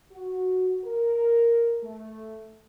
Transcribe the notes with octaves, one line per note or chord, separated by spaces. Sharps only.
F#4
A#4
A3